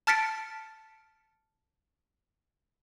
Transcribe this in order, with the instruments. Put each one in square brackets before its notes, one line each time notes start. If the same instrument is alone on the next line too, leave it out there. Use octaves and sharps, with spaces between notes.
[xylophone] A5 F6 A6 B6 C#7 D7